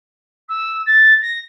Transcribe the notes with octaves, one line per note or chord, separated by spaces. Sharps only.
E6
A6
A#6